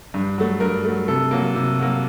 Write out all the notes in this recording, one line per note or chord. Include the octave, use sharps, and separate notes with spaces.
G2
F#3 A3
G2 A#4
F#3 A3
C3 A4
F#3 A#3
C3
F#3 A#3